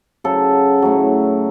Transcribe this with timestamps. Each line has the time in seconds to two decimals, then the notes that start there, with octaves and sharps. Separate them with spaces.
0.24 C#3 F#3 A4
0.82 A2 F#3